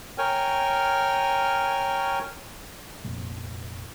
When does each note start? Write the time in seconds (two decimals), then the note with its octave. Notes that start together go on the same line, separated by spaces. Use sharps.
0.18 A#4 C#5 G5 G#5 F6
3.05 F1 A#1